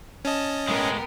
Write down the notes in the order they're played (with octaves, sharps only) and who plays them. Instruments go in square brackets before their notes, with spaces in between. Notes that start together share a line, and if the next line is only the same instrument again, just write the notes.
[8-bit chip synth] C#4 D#5 [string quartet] A5
[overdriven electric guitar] A2 G#3 [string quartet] B3 A#4 G5